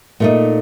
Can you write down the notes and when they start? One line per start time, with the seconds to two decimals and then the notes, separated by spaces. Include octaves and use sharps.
0.20 A#2 A3 D#4